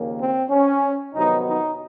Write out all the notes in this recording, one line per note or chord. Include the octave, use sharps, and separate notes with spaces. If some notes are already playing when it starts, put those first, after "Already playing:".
Already playing: D#2 C#3 F3 A#3
C4
C#4
F2 C3 D#3 F#3 B3 D#4
D#4